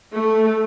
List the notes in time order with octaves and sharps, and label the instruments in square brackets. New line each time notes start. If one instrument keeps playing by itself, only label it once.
[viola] A3